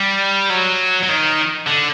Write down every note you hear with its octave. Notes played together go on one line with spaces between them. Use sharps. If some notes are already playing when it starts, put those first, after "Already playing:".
Already playing: G3
F#3
F#3
D#3
D3